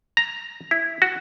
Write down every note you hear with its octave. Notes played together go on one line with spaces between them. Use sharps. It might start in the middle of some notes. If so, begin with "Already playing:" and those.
A#5
E4
F#4